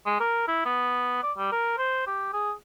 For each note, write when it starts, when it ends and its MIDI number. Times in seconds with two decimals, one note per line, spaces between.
0.06 0.17 56
0.20 0.45 70
0.48 0.62 64
0.65 1.19 59
1.23 1.32 74
1.37 1.48 55
1.52 1.78 70
1.78 2.06 72
2.07 2.29 67
2.33 2.52 68